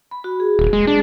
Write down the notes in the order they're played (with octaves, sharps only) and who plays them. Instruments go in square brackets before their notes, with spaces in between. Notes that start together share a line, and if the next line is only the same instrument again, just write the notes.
[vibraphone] B5
F#4
G#4
[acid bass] D#1
G#3
D4